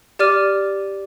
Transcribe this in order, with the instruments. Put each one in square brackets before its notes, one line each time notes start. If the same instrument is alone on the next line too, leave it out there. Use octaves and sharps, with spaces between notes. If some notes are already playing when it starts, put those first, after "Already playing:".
[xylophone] G4 D5 D6 F6 D#7